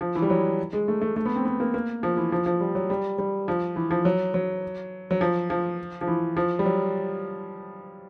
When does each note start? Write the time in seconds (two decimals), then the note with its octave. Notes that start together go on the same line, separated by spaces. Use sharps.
0.01 F3
0.15 E3
0.22 G3
0.30 F#3
0.73 G#3
0.88 A3
1.01 A3
1.16 A3
1.26 B3
1.36 C4
1.45 B3
1.60 A#3
1.74 A#3
2.03 F3
2.17 E3
2.32 F3
2.46 F3
2.61 G3
2.75 F#3
2.90 G3
3.18 G3
3.48 F3
3.76 E3
3.91 F3
4.05 F#3
4.34 F#3
5.11 F#3
5.21 F3
5.50 F3
6.01 F3
6.07 E3
6.37 F3
6.59 G3
6.65 F#3